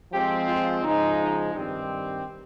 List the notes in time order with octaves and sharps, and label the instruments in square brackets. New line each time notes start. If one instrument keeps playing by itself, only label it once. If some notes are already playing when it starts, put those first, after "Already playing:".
[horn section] F3 G#3 C4 [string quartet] G4
[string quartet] F4
[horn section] C#3 F3 G#3 [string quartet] D#4
[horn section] G2 D#3 G3 C4 G4